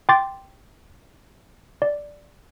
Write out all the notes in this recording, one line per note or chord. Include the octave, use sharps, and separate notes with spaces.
G5 C6 D6 A6
D5